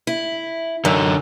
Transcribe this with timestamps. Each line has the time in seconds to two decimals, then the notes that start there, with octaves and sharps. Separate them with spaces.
0.07 E4
0.85 F#2 D3 D#4